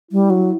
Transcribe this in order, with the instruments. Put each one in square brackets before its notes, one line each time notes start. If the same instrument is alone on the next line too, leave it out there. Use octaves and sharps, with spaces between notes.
[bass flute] G3 [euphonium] E4
[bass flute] F#3